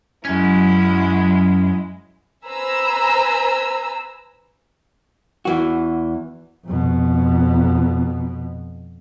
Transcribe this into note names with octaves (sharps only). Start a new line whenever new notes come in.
F#2 F#3 G#3 C#4 E4
B4 C5 G#5 A#5 B5 E6
E2 E3 F#4
F2 B2